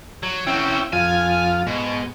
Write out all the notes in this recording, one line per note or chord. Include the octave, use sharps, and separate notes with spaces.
F#3
C4 C#4 E4 F#4 G5
F2 F4 G#5
G#2 B2